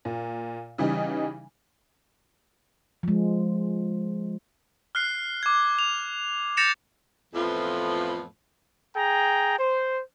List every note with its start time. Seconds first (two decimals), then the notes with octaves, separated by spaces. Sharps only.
0.05 A#2
0.78 C#3 E3 G3 D#4
3.03 F3 G#3
4.95 F6 F#6 C7
5.43 D6 G#6
5.79 F7
6.57 G6 A6 A#6 C#7 E7 F7
7.34 F2 A2 E3 F3 B3 F4
8.96 G#4 G5 A#5
9.58 C5